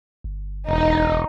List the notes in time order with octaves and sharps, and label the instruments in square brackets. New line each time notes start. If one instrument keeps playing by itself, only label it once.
[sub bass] G1
[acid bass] E1 [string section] D#4